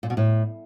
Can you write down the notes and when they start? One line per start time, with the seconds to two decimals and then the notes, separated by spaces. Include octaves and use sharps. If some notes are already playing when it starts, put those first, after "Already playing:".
0.03 A#2
0.10 B2
0.17 A2